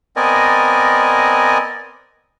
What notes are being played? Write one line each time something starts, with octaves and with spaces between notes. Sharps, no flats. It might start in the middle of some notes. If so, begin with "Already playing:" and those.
B3 C4 A#4 D5 D#5 G#5